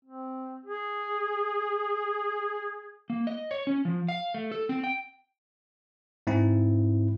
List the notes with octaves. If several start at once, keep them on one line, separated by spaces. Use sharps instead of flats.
C4
G#4
A#3
D#5
C#5
C#4
F3
F5
A3
A4
C4
G5
G#2 C4 E4